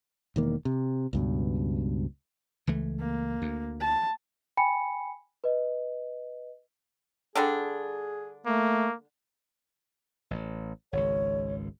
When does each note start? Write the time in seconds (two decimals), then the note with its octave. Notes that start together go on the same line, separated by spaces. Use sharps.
0.36 E1 D#3 A#3
0.65 C3
1.13 C#2 G2 B2
2.67 C#2 E3 A3
3.00 A#3
3.42 D2
3.81 A5
4.57 G5 G#5 B5 C#7
5.44 B4 D#5
7.35 D3 G3 D4 G#4
8.46 A3 A#3
10.31 A1
10.93 G#1 C#2 C#5